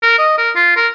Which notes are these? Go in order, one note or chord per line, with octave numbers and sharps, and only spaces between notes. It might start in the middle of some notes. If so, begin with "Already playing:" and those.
A#4
D#5
A#4
F4
A#4